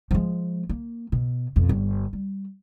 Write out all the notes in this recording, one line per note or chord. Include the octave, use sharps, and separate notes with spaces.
F3 G#3
A#3
B2
F2 B2
G1
G3